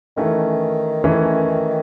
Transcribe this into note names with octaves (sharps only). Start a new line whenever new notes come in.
D#3 E3 A3 C#4
E3 A3 C#4